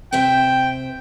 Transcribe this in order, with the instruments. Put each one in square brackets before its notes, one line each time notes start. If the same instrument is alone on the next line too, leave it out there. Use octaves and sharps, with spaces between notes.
[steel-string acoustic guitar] C3 C5 E5 [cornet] G5